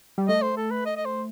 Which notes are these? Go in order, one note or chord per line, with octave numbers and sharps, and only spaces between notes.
G3
A3 D#5
C5
A4
B4
D#5
D#5
C5